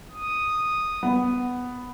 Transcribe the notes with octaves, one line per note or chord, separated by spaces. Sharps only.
D#6
B3